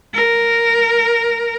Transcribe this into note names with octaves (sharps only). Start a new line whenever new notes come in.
A#4